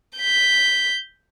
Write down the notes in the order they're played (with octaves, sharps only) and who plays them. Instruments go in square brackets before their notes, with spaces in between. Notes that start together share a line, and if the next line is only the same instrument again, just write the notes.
[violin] G6 B6